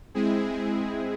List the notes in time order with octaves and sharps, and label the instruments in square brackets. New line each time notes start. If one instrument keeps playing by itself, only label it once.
[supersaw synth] G#3 C4 E4 G#4